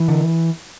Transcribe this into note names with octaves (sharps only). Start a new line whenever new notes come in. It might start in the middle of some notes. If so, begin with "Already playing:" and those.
Already playing: E3
D3